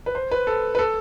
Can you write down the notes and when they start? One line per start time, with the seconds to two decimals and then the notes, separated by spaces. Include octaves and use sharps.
0.06 B4
0.15 C5
0.31 B4
0.47 A4
0.75 B4
0.79 A4